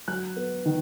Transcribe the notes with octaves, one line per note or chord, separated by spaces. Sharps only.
F#3 F#6
B3
D#3